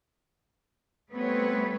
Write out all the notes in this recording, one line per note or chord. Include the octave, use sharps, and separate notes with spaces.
G3 A3 B3 C4 B4 C#5